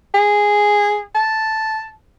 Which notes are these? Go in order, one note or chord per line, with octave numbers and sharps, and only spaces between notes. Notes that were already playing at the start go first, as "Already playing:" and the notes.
G#4
A5